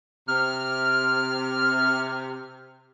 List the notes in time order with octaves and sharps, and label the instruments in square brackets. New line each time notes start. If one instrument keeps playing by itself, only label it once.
[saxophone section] C3 [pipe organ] F6